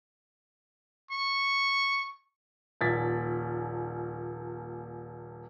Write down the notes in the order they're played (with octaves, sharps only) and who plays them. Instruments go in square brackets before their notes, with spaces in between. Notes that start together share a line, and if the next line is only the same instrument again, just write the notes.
[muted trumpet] C#6
[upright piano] D#1 A#1 G#6 A6 B6